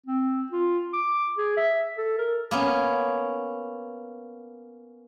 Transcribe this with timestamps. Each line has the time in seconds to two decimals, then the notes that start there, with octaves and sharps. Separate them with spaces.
0.06 C4
0.52 F4
0.93 D6
1.38 G#4
1.57 E5
1.98 A4
2.19 A#4
2.51 A#3 B3 C#4